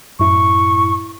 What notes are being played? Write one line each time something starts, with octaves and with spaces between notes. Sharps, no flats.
F#2 A2 E4 C#6